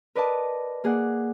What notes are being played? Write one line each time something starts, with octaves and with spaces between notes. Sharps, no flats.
A#4 B4 D5 D#5 A5
A#3 G#4 D5 F#5